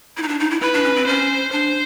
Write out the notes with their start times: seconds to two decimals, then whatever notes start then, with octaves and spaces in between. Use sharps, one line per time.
0.17 E4
0.23 D#4
0.28 D4
0.40 D#4
0.51 E4
0.61 E4 B4
0.74 D4
0.84 C#4
0.96 C4
1.07 C#4 C5
1.52 D4 C5